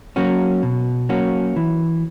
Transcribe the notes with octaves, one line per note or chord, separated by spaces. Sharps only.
F#3 A#3 C#4 F#4
B2
F#3 A#3 C#4 F#4
E3